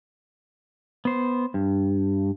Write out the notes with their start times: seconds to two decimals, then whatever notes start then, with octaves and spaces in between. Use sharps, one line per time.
1.05 B3 C5
1.54 G2